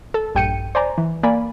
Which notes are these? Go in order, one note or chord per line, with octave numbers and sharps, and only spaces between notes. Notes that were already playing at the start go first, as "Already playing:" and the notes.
A4
A#1 G2 G5 G6 C#7 D#7
C5 D5 G#5 A#5
E3
A#3 D5 F5 G#5 B5